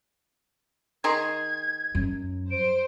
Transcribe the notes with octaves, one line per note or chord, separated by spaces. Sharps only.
D#3 G#4 C6 G#6
F#2
C5 D7